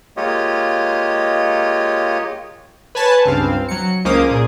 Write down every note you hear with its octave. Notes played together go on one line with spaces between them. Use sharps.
G#3 A#3 F4 G4 C#5 D#5
B4 C#5 G#5 A5
C#2 G2 C4 F5
F#3 C#7
C#2 A#3 C#4 C5 D6 D#6
A#2 G#4